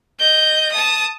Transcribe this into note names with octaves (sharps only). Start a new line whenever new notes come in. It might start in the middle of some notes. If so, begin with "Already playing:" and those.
D#5 G6
A5 D#6